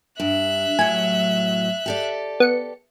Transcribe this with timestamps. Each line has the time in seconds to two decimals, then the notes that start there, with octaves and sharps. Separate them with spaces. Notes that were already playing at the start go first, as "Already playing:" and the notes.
0.20 G2 E5 F#6
0.79 A2 F#3 G#5
1.86 G4 A4 D5
2.40 B3 C#7